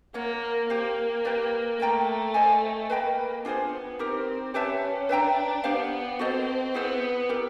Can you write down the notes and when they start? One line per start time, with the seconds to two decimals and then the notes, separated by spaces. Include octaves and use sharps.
0.14 A#3 A#4 C#5 F#5
0.69 A#3 G4 C5 F5
1.25 G4 B4 D5
1.79 A3 A#4 D5 G5 A#5
2.34 A4 C5 D#5 G#5
2.90 A#3 B4 D#5 G5 B5
3.45 B3 D4 F4 G#4 C5
3.99 C4 D#4 G4 A#4
4.54 C#4 G4 B4 E5 A5
5.09 D4 B4 E5 G5 A#5
5.64 B3 G4 C5 F5
6.19 C4 F#4 A4 C5 D#5
6.74 B3 E4 G#4 C5
7.29 E4 G4 A#4